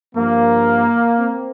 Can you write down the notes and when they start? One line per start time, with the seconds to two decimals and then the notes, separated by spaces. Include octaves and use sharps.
0.15 G2 F3 A#3
1.20 C4